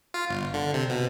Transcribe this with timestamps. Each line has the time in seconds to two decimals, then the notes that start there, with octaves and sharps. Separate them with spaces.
0.14 F4
0.29 G1
0.54 D3
0.74 C3
0.90 B2